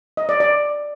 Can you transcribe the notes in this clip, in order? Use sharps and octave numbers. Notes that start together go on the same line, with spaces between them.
D#5
D5
D5